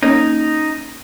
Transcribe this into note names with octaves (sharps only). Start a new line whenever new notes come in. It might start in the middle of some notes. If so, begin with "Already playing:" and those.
A#3 C#4 D#4